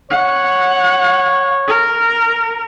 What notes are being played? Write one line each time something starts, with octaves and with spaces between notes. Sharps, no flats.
C#5 F#5
A#4